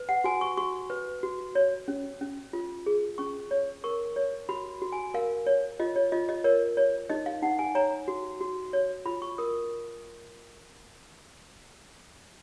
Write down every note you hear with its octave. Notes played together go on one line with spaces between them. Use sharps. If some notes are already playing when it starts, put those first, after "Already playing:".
Already playing: B4
F#5
F#4 G#5
C#6
F#4 C#6
B4
F#4
C#5
C#4
C#4
F4
G#4
C#4 C#6
C#5
A#4 C#6
C#5
F#4 B5
F#4
G#5
A#4 F5
C#5
F4 D#5
C#5
F4 D#5
D#5
A#4 C#5
C#5
D#4 D#5
F5
D#4 F#5
G#5
C#5 A#5
F#4
F#4
C#5
F4 B5
C#6
A#4 D#6